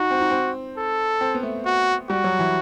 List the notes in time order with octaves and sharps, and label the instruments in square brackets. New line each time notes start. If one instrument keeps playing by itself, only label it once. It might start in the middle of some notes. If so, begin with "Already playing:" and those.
Already playing: [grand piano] D#4 [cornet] F#4
[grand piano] C4
D#4
C4
[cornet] A4
[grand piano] C4
B3
A3
[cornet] F#4
[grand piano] G3 [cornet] F#4
[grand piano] F#3
E3